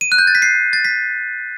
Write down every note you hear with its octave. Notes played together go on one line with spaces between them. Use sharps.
D#7
F#6
G6
A6
B6
C7
A6
B6